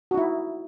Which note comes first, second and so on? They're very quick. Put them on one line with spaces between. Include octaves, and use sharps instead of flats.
F#4 D#4 E4